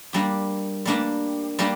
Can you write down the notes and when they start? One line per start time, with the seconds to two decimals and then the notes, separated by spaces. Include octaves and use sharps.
0.13 G3 A#3 D4 G4
0.85 G3 A#3 D4 G4
1.59 G3 A#3 D4 G4